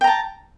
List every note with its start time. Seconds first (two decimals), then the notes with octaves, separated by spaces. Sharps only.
0.01 G5
0.04 A#5
0.07 A5